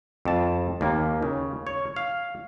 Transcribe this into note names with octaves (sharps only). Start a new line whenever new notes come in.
F2 A5
D#2 A#3
C#3
C#5
F5